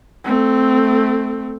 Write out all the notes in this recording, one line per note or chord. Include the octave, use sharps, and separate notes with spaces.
A3 C4